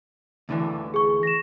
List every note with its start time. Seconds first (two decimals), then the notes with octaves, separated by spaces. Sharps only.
0.49 D2 D3 E3
0.94 G#4 C#6
1.23 A#6 E7